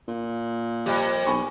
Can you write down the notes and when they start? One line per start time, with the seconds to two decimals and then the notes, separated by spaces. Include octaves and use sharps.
0.08 A#2
0.86 F2 G3 D5 D#5
1.27 B1 G#5 B5 C#6